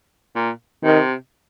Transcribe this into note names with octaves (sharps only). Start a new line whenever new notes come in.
A#2
C3 D#3